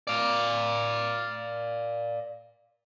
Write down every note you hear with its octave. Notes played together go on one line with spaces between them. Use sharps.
D5 F5